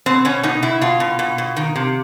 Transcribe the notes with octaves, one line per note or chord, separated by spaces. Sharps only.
B2 C4
B2 C#4
B2 D#4
B2 E4
B2 F4
B2
B2
B2
D#3
C3